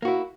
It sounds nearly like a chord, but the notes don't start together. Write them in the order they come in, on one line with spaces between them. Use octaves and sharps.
A#3 F#4 E4